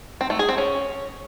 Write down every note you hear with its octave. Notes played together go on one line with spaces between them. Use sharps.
C4
A3
G#4
C4
C#4